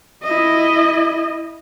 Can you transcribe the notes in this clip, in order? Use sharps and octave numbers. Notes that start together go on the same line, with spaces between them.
E4 D#5